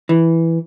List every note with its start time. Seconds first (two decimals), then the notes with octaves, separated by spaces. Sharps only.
0.09 E3